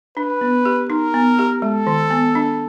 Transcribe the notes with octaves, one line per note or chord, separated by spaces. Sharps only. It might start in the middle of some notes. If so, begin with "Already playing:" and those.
D4 B4
B3
G4
D#4 A#4
B3
G4
G#3 A4
D#3
B3
D4